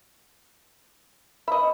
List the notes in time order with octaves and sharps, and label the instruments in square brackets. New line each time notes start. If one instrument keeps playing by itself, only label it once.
[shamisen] D#5 E5 [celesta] B5